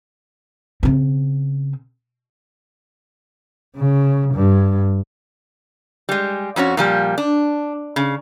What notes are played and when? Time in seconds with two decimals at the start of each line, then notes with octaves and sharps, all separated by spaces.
0.83 C#3 C4
3.77 C#3
4.34 G2
6.09 G3 G#3
6.56 F2 C#4 F#4 C#5
6.77 A#2 F3 G3
7.18 D4
7.96 C#3